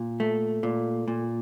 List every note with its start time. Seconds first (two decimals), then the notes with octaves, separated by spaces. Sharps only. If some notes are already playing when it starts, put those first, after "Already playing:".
Already playing: A#2
0.20 A3
0.63 A#2
1.08 A#2